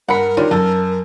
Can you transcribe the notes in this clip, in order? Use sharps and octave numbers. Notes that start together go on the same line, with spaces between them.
G2 A#4 F#5 B5 C#7
D#3 G3 C#4 D4 F4
F#2 A4